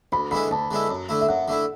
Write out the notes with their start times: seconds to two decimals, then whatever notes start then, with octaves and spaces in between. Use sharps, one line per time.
0.12 D2 B5
0.31 D3 G#3 B3 E4 B5
0.51 D2 A5
0.71 D3 G#3 B3 E4
0.89 F#2
1.09 D3 A3 E4
1.21 E5
1.28 F#2 F#5
1.48 D3 A3 E4